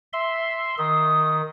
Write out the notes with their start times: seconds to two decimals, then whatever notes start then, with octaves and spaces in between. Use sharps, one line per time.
0.13 E5 C6
0.78 D#3 D#6